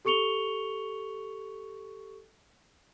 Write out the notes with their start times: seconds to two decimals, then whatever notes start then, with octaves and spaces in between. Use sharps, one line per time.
0.05 G4 A4 C#6 C#7 F7 G7